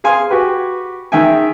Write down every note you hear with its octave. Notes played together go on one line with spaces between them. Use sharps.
G#4 F5 G#5 C6
F#4 G4 B4
D#3 G#3 E5 G5 G#5